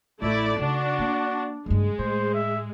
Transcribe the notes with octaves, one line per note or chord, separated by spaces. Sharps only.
A1 A3 E4 D5
C#3 D4 D#4 F#4
A#3
F#1 G2 G#3
A2 C5
E5